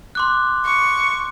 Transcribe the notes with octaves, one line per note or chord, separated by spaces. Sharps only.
C6 D6 F#6
C#6